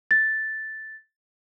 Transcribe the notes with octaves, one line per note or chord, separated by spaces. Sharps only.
A6